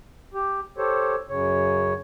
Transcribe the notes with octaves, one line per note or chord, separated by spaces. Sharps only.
G4
G4 A4 C5 C#5
F#2 C#3 C#5